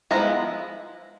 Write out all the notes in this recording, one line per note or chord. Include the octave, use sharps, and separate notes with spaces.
F3 G#3 B3 E4 A#5